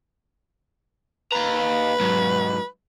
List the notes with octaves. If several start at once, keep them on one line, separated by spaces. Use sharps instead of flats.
D#2 B4 A#5
G#2 F#3